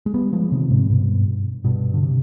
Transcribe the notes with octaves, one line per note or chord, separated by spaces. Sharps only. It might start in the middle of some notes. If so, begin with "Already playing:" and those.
G#3
G3 B3
F3 G#3
C3 D#3
G#2 C3
G2 B2
G2 B2
D3
C3